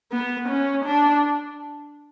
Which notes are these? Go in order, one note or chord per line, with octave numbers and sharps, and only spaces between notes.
B3
C#4
D4